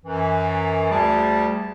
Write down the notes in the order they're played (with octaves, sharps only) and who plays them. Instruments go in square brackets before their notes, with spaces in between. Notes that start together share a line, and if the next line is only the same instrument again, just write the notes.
[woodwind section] F#2 E3
D2 G3 G#4 A5